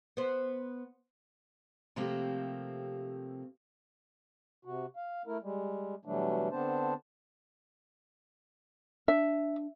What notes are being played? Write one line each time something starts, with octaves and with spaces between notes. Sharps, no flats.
B3 C5
C3 F3 A3 A#3 C4 G4
C3 F#4
F5
A3 E4 A#4
G3 G#3
B2 E3 F#3 G3 A3 D4
D3 B3 C4 D4 C5 A5
D4 E5